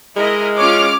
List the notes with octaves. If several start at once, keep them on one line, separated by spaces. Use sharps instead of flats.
G#3 E4 A#4 D#5
C#4 F4 C#5 D6 F6